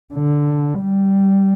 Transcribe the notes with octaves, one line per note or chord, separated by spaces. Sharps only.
D3
G3